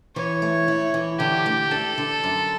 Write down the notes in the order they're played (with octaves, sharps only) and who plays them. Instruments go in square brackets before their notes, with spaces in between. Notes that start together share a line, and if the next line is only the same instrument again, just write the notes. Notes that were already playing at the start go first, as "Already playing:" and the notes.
[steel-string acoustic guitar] E3 [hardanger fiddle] C#5
[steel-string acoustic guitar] A3
E4
E3
[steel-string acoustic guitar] D3 [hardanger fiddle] G4
[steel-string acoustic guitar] A3
[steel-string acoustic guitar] D4 [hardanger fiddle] A4
[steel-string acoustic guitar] D3
F#2